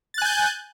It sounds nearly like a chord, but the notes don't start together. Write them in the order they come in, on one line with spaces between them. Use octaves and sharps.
A6 F#6 G#5 G6